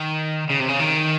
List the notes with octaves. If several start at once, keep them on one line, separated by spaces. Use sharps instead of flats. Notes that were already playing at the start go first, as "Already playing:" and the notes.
Already playing: D#3
C#3
C3
C#3
D#3